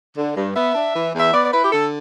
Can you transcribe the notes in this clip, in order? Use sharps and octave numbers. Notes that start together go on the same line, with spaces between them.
D3
G2
B3 E5
D4
E3
E2
E5
B3 D5
D5
E4 B4
G4
D3 A4